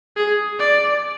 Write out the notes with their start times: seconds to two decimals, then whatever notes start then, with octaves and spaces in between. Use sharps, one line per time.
0.16 G#4
0.59 D5